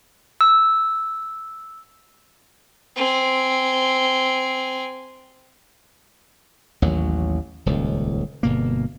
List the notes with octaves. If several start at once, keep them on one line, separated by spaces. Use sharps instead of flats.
E6
C4 G#5
A1 D#2 F#3
D#1 C#2
G1 B2 A#3